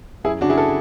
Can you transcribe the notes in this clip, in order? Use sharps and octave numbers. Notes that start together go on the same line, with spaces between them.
F#2 E4 G#4
C#3 D4 F#4
E4 G#4
A4